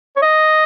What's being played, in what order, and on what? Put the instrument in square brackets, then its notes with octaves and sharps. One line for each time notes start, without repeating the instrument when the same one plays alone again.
[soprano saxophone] C#5
D#5